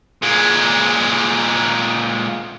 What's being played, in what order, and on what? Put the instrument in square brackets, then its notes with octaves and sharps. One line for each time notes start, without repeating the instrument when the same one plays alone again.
[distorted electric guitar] A#2 G#3